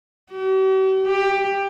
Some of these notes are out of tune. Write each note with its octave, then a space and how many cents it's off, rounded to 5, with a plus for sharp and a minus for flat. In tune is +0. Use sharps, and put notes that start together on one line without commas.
G4 -45
G4 +15